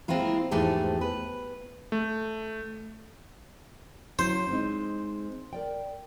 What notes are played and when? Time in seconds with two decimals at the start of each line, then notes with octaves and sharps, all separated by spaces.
0.08 G#3 A#3 C4 E4 F4 A#4
0.51 E2 G#2 F3 A3 G4 G#4
1.01 B4
1.92 A3
4.19 F#3 C#4 E4 C5
4.49 G#3 C4 D#4
5.53 A#4 D5 G5